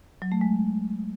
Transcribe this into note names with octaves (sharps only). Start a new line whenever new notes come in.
F#3
A3
G#3